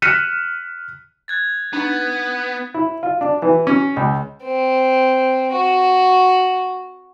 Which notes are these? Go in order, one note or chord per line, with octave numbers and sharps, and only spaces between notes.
F6 F#6 B6 C#7 D#7 E7
F#6 G#6 A6
B3 D4 D#4 C#6
E4
F4
D4
E3
C#4
C#2
C4
F#4